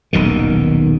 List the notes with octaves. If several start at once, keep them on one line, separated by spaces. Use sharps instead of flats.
D#1 B1 B2 D#3